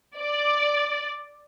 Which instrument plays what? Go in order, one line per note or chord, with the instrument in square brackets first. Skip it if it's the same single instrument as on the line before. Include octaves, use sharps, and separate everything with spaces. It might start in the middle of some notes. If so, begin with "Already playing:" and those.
[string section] D5